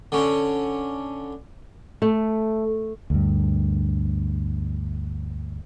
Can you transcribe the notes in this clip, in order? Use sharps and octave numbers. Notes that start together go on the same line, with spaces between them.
D3 C#4
A3
D2 G2